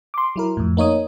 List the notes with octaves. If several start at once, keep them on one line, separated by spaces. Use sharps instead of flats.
C6 D6
F#3 E4 A#4
F2 A2
A#3 D#4 C#5 D#6